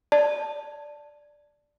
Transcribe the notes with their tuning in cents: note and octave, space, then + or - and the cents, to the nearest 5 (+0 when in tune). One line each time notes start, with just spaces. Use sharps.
D5 +0 A5 +0